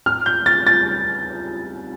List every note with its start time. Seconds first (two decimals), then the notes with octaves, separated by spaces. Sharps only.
0.06 F6
0.26 G6
0.46 A6
0.67 A6